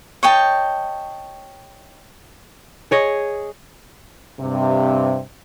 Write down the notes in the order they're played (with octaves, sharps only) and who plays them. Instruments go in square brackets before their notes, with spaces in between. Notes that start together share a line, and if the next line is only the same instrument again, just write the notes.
[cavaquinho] C#5 D#5 G5 A5
[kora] G#4 C#5 D#5
[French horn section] G2 C3